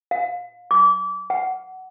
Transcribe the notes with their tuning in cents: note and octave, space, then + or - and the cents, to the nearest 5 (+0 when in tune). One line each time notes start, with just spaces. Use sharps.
F5 +30
D6 -25
F#5 +15